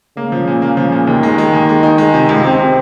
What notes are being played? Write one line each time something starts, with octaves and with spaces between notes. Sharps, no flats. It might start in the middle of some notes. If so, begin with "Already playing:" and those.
C#3 A#3
F3
A#2
A#3
F3
A#2
D#2 D#3
G#3
G#3
D#2
G#3
D#4
G#3
C3
C#2
C3 C4
C3